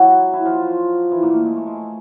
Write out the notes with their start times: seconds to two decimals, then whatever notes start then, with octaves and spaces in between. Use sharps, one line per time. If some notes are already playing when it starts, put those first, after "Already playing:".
Already playing: F#3 E4 F#4
0.33 E4
0.45 F3 F4
1.12 E3 E4
1.23 A#2 A#3
1.33 A3
1.45 G#3
1.56 A3
1.67 G#3
1.77 A3